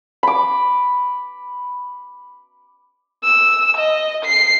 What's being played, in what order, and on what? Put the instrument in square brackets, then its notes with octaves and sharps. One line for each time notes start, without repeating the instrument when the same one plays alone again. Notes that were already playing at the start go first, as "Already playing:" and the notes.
[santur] B5 D6
[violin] E6
D#5
C7